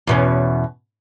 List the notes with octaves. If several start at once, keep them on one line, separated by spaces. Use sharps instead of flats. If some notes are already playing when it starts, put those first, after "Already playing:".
E2 B2 C#4